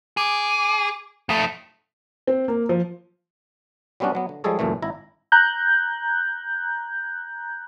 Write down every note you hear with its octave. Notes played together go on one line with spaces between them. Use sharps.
G#4 D6
F2 A3 D#6
C4
A#3
F3
F#3 G3 B3 C#4 D4 F#4
F#3 B3
D3
F3 G3 G#3 G#4 A4 C#5
C#2 F#2 A#2 E3 A3
G#1 E4 A#5
A#5 F#6 G6